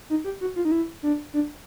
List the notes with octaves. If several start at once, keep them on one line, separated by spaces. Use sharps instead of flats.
D#4
G4
F#4
F4
D#4
E4
D4
D4